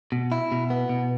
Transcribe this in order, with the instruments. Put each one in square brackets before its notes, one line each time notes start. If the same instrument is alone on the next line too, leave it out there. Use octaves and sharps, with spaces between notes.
[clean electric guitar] B2
E4
B2
B3
B2